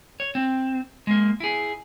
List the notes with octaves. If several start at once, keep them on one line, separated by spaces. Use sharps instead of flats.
C#5
C4
G#3 A#3
E4 G#4